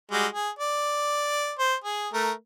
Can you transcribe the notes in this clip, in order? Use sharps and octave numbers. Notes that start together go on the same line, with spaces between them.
G3 G#3 F#4
G#4
D5
C5
G#4
A3 A#4